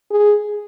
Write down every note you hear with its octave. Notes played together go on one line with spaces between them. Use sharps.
G#4